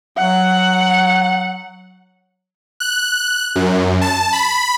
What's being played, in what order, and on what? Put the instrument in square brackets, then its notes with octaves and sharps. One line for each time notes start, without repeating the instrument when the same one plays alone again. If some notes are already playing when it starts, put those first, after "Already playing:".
[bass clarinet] F#3 [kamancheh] F#5
[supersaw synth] F#6
F#2
A5
B5